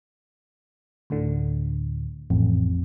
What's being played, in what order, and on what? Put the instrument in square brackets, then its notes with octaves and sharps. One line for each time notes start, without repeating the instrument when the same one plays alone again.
[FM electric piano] D2 A2 D3
[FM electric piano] A1 [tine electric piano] F2